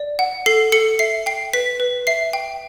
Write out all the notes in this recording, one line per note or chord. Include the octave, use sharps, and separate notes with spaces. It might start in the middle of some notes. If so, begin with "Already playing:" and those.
Already playing: D5
F#5
A4 C7
A4 C#7
E5 C7
G5 C7
B4 B6
B4
E5 C7
G5